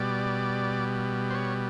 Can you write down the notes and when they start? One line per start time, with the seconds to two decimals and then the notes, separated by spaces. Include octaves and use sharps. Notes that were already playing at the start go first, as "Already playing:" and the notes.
Already playing: B2 G3 D5
1.30 C5
1.34 C#5